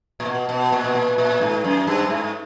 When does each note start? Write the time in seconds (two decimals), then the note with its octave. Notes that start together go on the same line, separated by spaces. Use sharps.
0.20 A#2
0.25 B2
0.49 B2
0.72 A#2
0.84 B2
0.95 A#2
1.18 A#2
1.41 G#2
1.64 F#2
1.87 G2
2.10 G#2